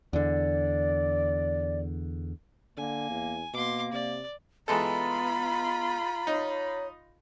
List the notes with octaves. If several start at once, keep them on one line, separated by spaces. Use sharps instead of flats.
E2 D3 D5
D3 A#3 G#5
E2
B2 A#3 C6 D6
C3 D5
E3 G#3 B3 F4 A4 A#5 B5
D#4 C#5